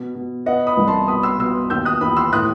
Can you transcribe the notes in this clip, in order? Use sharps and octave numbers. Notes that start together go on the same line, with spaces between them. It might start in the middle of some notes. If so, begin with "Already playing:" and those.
Already playing: B2
B2
B3 D#5 F#5
B5 D#6
C2
A5 C6
B2 B5 D#6
C6 E6
B2 C6 E6
D#2 E6 G6
D#6 F#6
D#2 B5 D#6
C6 E6
A2 D#6 F#6